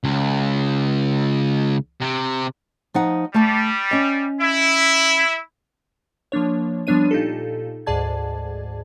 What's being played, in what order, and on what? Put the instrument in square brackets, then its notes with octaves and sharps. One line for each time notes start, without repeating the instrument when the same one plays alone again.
[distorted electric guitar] C#2
C3
[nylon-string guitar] F3 D#4 F#5
[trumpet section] G3 [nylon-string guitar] A3 A5
[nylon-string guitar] C#4 D#5
[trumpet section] E4
[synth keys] F3 A#3 D4 C#5
F3 G3 B3 D4 C#5 D#7
A#2 D#4 F4 G4 A4
D2 G#2 G#4 D5 A5 G#6